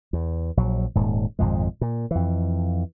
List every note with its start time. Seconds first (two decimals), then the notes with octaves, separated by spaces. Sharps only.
0.13 E2
0.57 A#1 F#3
0.95 D#1 G#2
1.39 G#1 F2 A#2 G#3
1.81 A#2
2.11 F2 E3